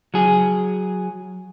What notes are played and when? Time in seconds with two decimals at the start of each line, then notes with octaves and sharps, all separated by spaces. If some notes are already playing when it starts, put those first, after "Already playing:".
0.14 F#3 G#4